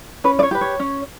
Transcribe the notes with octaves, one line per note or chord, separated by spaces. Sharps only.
C#4 B4
D5
C#5
G4 B4
C#5
C#4